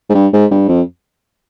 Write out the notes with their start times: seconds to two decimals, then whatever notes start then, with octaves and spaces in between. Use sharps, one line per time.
0.10 G#2
0.14 G2
0.33 G#2
0.51 G2
0.69 F2